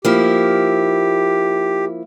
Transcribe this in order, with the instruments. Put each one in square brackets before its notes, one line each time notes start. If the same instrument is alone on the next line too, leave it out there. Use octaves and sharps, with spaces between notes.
[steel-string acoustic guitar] F3 A#3 E4 [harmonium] G4